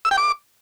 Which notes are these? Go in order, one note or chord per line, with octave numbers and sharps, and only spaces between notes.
E6
G5
D6